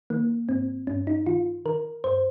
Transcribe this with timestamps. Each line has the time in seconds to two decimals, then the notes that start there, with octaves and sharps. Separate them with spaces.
0.10 D#3 A#3
0.49 G#2 C4
0.87 G2 C#4
1.07 D#4
1.26 D#3 F4
1.66 D#3 A#4
2.04 G2 C5